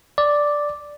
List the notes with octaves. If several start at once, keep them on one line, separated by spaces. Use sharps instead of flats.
D5